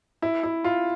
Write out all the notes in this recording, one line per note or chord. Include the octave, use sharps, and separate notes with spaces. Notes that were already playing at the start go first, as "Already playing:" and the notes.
E4
E4
F4